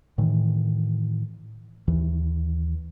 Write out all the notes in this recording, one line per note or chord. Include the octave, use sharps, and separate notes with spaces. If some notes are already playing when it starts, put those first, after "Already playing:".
A2 D#3 E3
D#2 E3